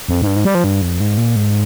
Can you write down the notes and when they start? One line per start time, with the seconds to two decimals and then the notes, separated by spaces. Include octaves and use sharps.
0.08 F2
0.22 G#2
0.27 G2
0.36 G#2
0.45 G3
0.55 F3
0.64 G2
0.82 F2
1.00 G#2
1.17 A#2
1.36 G#2